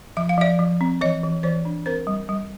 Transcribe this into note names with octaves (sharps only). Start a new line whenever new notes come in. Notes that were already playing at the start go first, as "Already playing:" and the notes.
F3 E5
F5
F3 D5 E5
F3
C4
E3 C#5 D#5
E3
E3 C5 D5
D4
C4 A#4 C5
G3
G3